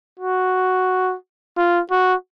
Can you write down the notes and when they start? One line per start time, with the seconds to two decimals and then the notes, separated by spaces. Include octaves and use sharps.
0.19 F#4
1.57 F4
1.91 F#4